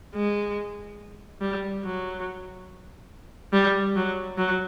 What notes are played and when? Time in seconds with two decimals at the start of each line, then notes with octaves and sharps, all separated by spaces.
0.15 G#3
1.42 G3
1.84 F#3
3.53 G3
3.95 F#3
4.38 F#3